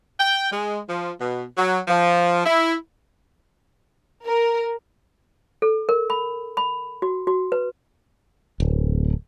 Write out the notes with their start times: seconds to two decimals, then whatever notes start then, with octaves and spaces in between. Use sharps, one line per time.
0.20 G5
0.51 G#3
0.88 F3
1.20 B2
1.57 F#3
1.88 F3
2.46 E4
4.25 A#4
5.62 A4
5.89 A#4
6.10 B5
6.57 B5
7.02 F#4
7.27 F#4
7.52 B4
8.60 D1